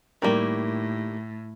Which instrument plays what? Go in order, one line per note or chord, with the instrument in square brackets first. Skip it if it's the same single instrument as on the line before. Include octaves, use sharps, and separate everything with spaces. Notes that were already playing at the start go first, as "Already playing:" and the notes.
[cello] A2 [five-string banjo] D#3 G3 A#3